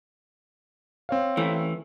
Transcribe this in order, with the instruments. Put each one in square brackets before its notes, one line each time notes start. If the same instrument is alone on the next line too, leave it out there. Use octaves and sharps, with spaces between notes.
[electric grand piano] C4 C#5 F5
[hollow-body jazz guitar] E3 A3